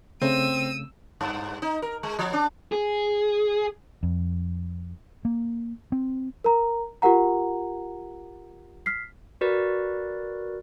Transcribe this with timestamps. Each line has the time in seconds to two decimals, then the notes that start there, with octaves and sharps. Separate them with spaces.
0.22 C#3 A3 C4 E6 D#7
1.21 G2
1.62 D#4
1.82 A#4
2.03 G#3
2.19 F3
2.33 D4
2.72 G#4
4.03 F2
5.25 A#3
5.92 C4
6.44 A#4 A#5
7.02 F4 G4 A#4 F#5 A#5
8.86 F6 B6 C7
9.41 F#4 A#4 B4 D5